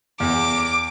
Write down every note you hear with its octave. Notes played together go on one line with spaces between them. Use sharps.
E2 D6